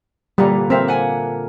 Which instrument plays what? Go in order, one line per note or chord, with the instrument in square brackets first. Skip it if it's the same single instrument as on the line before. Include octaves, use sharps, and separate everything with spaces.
[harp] A#2 D3 E3 [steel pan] G3
[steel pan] C4 [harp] A#4 E5 F5
[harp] F#5 G#5